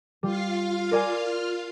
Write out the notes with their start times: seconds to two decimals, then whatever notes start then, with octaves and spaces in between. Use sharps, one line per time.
0.23 G3 F4 F5
0.91 A#4 D5 G#5